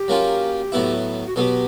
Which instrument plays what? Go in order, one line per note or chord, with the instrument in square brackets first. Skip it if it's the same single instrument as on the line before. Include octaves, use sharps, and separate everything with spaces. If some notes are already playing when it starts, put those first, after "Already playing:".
Already playing: [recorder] G4
[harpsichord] F#3 A#3 C#4 F4
A2 F#3 B3 E4
[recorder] F#4
[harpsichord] B2 F#3 B3 [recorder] G4 A4